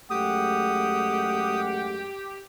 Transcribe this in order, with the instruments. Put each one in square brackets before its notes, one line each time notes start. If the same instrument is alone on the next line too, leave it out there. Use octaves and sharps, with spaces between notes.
[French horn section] F#2 G#3 A3 [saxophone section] G4 [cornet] F#5 [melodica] D#6